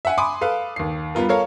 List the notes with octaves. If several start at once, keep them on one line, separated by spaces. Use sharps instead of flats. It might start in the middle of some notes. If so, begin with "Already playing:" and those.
E5 F#5 G#5
G#5 B5 C6 D6 D#6
A4 B4 F5
D#2 C7
G3 B3 F4 A#4
A4 A#4 C#5 F5